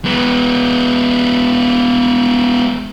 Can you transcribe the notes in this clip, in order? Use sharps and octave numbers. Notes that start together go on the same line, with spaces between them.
G#3 B3